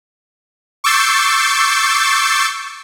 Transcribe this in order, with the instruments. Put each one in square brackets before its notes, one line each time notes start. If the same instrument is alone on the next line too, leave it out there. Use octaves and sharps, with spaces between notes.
[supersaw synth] C#6 D6 E6 G6 A6 C7